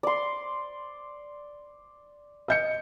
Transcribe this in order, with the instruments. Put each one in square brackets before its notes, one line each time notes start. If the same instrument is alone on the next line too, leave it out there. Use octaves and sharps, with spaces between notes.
[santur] D5 C6
[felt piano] D#5 G6 C#7